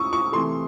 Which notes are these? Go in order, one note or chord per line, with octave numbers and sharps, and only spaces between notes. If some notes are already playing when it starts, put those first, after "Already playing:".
Already playing: C#3 C#6 D#6 E6
C#6
C3 E3 A3 C6